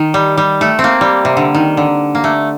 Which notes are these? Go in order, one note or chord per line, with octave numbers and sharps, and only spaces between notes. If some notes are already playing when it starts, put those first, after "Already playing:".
Already playing: D#3
G3
G3
A3
C4
A#3
G3
C3
D3
D#3
D3
A#3
A3